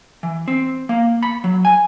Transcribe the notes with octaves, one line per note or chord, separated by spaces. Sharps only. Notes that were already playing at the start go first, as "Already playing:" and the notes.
E3
C4
A#3
B5
F#3
G#5